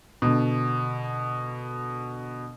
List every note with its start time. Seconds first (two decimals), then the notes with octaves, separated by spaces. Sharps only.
0.22 B2 D3